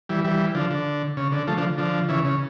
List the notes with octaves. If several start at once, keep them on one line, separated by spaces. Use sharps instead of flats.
E3 G3
E3 G3
D3 F3
D3
C#3
D3
F3 A3
D3 F3
D3 F3
C#3 E3
C#3